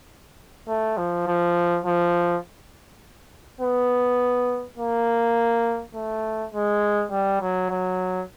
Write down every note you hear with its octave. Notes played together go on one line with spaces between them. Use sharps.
A3
F3
F3
F3
B3
A#3
A3
G#3
G3
F#3
F#3